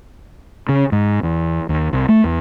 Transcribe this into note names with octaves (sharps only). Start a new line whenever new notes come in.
C#3
G#2
E2
D#2
C2
A3
E2